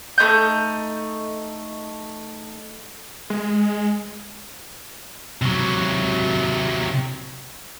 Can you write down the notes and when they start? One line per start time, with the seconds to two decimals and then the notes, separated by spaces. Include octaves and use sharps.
0.18 A3 B3 D#4 G6
3.30 G#3
5.42 C3 F#3